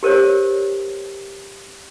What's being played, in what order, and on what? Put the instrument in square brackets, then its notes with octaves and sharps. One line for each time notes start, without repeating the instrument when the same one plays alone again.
[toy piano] G4 A#4 C5 C#5